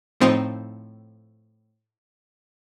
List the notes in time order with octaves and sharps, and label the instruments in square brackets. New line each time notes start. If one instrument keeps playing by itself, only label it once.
[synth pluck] A2 F3 C4 D#4 G5 C7